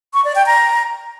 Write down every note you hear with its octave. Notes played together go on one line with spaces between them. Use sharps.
C#6
D5
G5
A#5